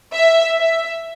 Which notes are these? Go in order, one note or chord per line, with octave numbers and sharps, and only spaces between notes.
E5
E5